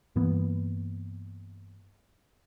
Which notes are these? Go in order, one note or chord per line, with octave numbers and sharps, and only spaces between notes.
G2 E3 A#3 B3